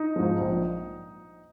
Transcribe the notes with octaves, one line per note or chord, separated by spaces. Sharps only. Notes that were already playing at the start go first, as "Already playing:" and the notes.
Already playing: D#4
G#2 F3
A#1